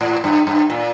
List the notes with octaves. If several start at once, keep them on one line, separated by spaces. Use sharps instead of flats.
A2
G2
G2
A#2